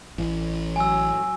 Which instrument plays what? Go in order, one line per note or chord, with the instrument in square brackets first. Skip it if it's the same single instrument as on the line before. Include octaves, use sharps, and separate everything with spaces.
[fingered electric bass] A1
[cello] F#3 [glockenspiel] G#5 E6